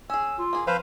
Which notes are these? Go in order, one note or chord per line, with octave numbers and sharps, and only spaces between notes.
C#4 G#4 E6
F4
A#3 G#4
F3 C4 B4 C5 F5